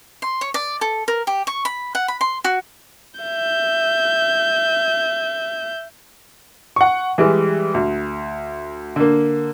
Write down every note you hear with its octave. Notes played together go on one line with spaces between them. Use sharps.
C6
C#5
D5
A4
A#4
G4
C#6
B5
F#5
B5
C6
F#4
E5 G6
F#5 C#6
E3 G3 G#3
D2
D3 A#3